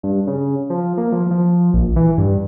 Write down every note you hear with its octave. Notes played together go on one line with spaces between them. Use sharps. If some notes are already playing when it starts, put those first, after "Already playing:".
G2
C#3
F3
A#3
F3
F3
A#1
E3
G2